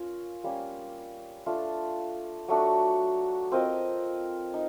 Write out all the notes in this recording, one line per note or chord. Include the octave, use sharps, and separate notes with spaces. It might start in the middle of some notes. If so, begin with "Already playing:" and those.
Already playing: C#4 F4 A#4
G3 A#3 C#4
A3 D4 F4
F#3 A3 D4 F#4
C4 F4 A#4 D#5
D#4